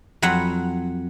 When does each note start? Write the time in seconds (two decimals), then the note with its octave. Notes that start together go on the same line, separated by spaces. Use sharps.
0.22 F2 F#3 B4 F#5 B5